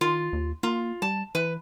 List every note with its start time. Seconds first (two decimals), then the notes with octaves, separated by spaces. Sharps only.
0.01 D#3 F4
0.33 D#2
0.63 A#3 F4
1.02 G3 A5
1.35 E3 B4